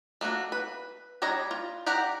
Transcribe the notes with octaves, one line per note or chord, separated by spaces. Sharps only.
A3 A#3 D4 F#4
B4
G3 D4 C#5 D#5 A#5
F4
G4 A#4 D5 F#5 A#5